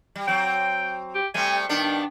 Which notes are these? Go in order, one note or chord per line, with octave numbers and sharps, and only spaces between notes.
G3
F#3 C4 G5
G4
G3 A3 C4 G#5
G2 D#3 B3 D4